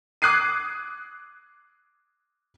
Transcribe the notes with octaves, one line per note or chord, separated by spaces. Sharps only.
D6 D#6 F#6 G#6 C7 D#7